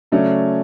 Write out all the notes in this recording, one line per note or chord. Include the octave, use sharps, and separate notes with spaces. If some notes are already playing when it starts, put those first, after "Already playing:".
C#3 F#3 A3 C#4 D5